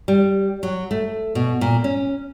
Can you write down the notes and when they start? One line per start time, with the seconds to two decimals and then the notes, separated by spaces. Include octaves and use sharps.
0.08 G3
0.63 F#3
0.91 A3
1.35 B2
1.61 A#2
1.84 C#4